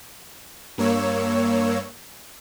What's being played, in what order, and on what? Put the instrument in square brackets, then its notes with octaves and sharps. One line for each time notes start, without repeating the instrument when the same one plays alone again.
[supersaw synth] G2 A#3 C#5 E6